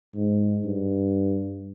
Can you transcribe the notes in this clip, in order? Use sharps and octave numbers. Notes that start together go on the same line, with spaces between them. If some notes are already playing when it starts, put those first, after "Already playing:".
G#2
G2